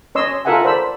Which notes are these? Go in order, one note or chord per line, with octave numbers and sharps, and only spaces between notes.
C#4 C#5 D#5 C6 E6
F4 A4 A#4 E5 F#5 G#5
A4 C5 D5 B5 E6